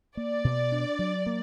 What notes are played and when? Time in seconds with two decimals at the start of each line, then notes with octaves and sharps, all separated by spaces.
0.17 A#3 D5
0.44 B2
0.72 D4
0.99 F#3
1.26 A#3